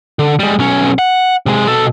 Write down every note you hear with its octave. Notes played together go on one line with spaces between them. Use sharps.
D3
G3 G#3
B1 C#4
F#5
C3 G#3
B2 A4